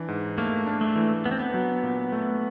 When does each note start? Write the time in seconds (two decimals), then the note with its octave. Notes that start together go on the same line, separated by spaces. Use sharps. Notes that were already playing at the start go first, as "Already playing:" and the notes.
Already playing: E3 D4
0.08 G#2
0.38 A3 A#3
0.66 D4
0.81 A3
0.96 E3
1.25 B3 D4
1.31 C4
1.40 B3
1.54 F#3
1.83 A#2
2.12 A3